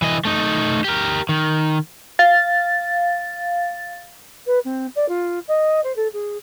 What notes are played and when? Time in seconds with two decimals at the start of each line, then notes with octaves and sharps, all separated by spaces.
0.02 E3 D#5
0.25 A3 D#4
0.84 G4 A#4
1.29 D#3
2.19 F5 A6
4.47 B4
4.65 C4
4.96 D5
5.09 F4
5.48 D#5
5.84 C5
5.96 A4
6.13 G#4